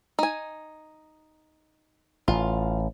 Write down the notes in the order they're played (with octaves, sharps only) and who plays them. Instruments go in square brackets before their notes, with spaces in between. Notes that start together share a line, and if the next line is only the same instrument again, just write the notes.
[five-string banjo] D#4 G#5
[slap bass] A1 [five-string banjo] F4